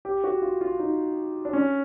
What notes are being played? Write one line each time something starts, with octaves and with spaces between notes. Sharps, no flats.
G4
F#4
F4
F4
D#4
D4
C#4